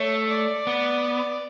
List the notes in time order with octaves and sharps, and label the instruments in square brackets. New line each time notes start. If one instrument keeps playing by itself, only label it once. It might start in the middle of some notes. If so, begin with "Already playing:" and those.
Already playing: [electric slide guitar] A3 [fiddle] C#5
[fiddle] D5
[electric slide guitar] B3